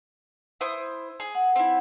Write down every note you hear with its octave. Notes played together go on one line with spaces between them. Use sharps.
E4 C5 D#6
G#4
F#5
C4 E4